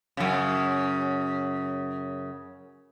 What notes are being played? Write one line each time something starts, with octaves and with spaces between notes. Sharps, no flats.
F#2 C#3